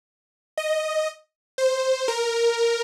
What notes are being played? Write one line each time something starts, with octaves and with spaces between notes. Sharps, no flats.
D#5
C5
A#4